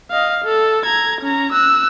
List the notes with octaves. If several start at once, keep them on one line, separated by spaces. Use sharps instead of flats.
D#5 F5
A4
A#5 G#6
C#4 A#5
E6 F#6